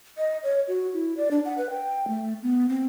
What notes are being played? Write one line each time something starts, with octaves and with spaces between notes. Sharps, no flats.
D#5
C#5
F#4
E4
D5
D4
F#5
B4
G5
A3
B3
C4